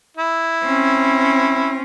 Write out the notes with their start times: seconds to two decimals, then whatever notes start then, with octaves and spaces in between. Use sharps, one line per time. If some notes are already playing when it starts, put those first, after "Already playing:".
0.17 E4
0.64 C4 C#4